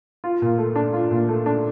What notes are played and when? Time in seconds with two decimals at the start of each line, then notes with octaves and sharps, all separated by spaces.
0.24 F4
0.42 A#2
0.58 A3
0.76 D4
0.93 F4
1.11 A#2
1.28 A3
1.46 D4